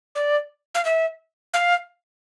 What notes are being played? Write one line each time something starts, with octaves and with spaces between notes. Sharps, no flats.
D5
F5
E5
F5